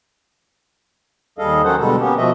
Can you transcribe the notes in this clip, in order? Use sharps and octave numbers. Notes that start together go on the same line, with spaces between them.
D#2 G3 G#4 A4 D#5 F5
D#3 F#3 C#4 A4 C5 F#5
B2 D3 G3 G#3 A4
A#3 B3 C#4 G4
B2 F3 F#4 D#5 E5